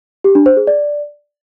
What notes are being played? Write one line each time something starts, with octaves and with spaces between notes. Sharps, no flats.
G4
D4
C5
G#4
D5